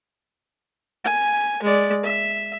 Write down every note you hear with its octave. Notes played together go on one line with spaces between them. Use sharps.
G#5
G#3 D5
E5